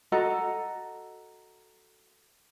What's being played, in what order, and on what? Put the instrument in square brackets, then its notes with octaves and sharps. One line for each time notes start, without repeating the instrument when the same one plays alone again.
[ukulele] F#4 A4 D#5 A#5